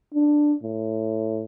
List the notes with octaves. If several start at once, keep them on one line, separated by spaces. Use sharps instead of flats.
D4
A2